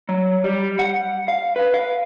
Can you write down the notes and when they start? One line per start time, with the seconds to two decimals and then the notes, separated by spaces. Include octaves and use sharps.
0.09 F#3
0.44 G3
0.79 F#5
1.28 F5
1.56 B4
1.74 F5